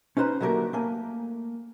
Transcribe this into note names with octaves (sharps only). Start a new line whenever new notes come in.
C#4 D#4 B4 C5 A#5
D3 F#3 A3 A#3 G4 A#4
A3 A#3 G#5